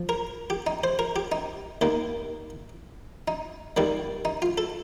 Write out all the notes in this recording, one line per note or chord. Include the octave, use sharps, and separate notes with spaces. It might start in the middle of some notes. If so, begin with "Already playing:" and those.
Already playing: F3
A#4
G4
D#4
C5
A#4
G4
D#4
D#2 D#3 A#3
D#4
D#2 D#3 G3 A#3
D#4
F4
A4